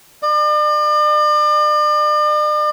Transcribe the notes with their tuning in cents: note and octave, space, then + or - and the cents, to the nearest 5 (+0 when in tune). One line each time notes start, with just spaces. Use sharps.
D5 +40